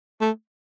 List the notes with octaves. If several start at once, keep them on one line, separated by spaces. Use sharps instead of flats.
A3